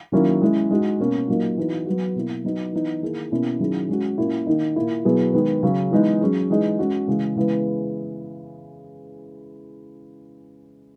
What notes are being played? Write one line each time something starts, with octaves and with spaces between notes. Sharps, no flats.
D#3 F#3 A#3 C#4 E4
G#3 C#4 E4
G#3 D#4 F#4
B2 A#3 C#4
A#2 F#3 A#3 D#4
E3 B3 D#4 F#4
F#3 B3 F#4
B2 A#3 E4
F#3 B3 D#4 F#4
E3 B3 D#4
D#3 A#3 E4 G#4
B2 A#3 C#4 E4
D#3 F#3 C#4 E4 G#4
G#3 C#4 F#4
A#2 A#3 C#4 E4
D#3 A#3 D#4
A#2 A#3 E4
B2 F#3 B3 E4 G#4
D#3 G#3 B3
C#3 F#3 C#4
E3 G#3 B3 D#4
F#3 C#4 G#4
E3 G#3 D#4 G#4
G#3 C#4 F#4
C#3 E3 G#3
C#3 E3 G#3 B3